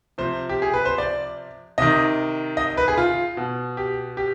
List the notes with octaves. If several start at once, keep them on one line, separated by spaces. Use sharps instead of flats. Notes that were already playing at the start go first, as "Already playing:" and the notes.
C3 F3 C5
G4
G#4
B4
C5
D5
C3 D#3 D#5
D#5
B4
G#4
F4
B2
G4
G4